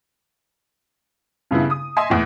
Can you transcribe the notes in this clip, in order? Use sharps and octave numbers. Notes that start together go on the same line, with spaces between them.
G2 C#3 B3 E4
D#6
D#5 E5 G#5 C6
E2 A2